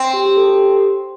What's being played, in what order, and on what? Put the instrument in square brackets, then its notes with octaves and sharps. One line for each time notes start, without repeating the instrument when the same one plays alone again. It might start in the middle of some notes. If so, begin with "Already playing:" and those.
Already playing: [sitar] C4
[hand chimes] G4
G4
A4
G4